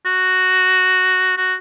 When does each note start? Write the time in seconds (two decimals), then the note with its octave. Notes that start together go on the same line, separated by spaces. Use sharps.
0.06 F#4
1.37 F#4